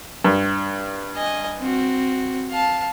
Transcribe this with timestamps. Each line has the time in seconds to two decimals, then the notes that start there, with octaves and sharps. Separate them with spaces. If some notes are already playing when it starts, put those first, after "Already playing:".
0.25 G2
1.16 D#5 G#5
1.60 C4 F#4
2.51 F5 A5